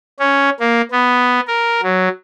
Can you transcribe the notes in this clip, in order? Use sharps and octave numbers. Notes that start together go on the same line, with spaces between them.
C#4
A#3
B3
A#4
F#3